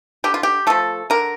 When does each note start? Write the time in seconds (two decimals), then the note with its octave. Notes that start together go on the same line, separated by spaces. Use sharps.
0.24 D3 G4
0.34 F4
0.43 G4
0.67 F3 A3 A4
1.10 D3 A#4